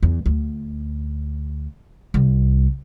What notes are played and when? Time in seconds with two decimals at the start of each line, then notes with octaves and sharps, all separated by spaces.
0.03 E2
0.26 D2
2.14 C2